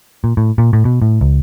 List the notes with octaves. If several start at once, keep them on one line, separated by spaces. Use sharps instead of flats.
A#2
A2
A#2
A2
B2
A2
C#2